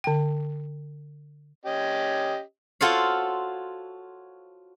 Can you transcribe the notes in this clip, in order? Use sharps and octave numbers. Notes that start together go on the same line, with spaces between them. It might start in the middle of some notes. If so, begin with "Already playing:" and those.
D3 G5
C#4 G4 D#5
F4 F#4 A4 C5 C#5 F5